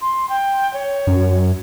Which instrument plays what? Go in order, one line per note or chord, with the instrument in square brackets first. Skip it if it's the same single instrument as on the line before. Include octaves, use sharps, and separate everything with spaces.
[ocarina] C6
G5
C#5
[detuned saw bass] F#2